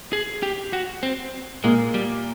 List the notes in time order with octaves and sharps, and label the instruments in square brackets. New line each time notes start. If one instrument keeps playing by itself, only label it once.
[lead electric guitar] G#4
G4
F#4
C4
[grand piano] A#2 A#3 [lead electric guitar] G#3
[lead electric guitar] G3